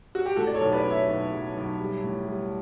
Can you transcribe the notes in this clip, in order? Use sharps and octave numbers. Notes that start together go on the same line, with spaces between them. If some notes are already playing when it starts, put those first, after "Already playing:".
F#4
G4
A2 F#4 A4
D5
A4 C#5
B1
B4 D5
C#4
C#5 E5
B1
F#3
B1
G3
A2
G3